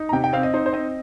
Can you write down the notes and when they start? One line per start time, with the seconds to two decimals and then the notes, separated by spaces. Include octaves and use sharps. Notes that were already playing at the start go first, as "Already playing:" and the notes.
Already playing: D#4
0.09 A#5
0.12 C3 G5
0.24 G5
0.33 C4 F5
0.43 D#5
0.54 D#4 C5
0.66 C5
0.73 C4 D#5